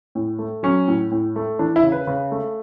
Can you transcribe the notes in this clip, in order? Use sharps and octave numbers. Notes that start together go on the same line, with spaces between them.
A2
A3
F#3 C#4
A2
A2
A3
E3 D4
E4
C#3
B4
C#3
A3